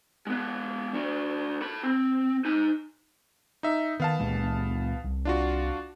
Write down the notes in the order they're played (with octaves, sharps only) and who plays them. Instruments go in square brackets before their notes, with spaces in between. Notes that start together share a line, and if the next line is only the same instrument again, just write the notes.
[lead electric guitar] G#3 B3
D4 F#4
A4 B5
C4
D#4 G#5
[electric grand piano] D#4 E5
[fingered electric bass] D#3 [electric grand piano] B3 F5 A5
[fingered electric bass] C#2 A#2 G#3
C2
[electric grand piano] D4 F4 F#4